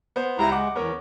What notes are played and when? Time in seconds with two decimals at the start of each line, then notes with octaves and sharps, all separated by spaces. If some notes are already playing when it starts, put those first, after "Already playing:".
0.16 B3 C5
0.39 C#2 G3 E4 A#5
0.52 G#3 F#5 D6
0.75 E2 B3 C#4 A#4